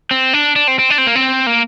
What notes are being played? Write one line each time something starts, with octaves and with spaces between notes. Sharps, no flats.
C4
D4
D4
C4
C4
D4
C4
A#3
C4
A#3